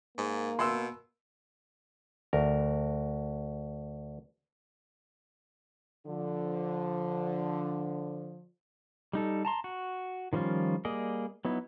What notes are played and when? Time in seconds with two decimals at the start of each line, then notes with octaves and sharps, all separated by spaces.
0.18 G#2 A#3
0.59 B2 C6 E6
2.33 D2 A#4
6.06 D3 F3
9.13 G3 D#4 A4
9.45 A5 A#5 C6
9.64 F#4
10.33 D#3 F3 G3 C#4 F4
10.85 G3 A#3 G#4 D5 D#5
11.45 F#3 B3 D#4 E4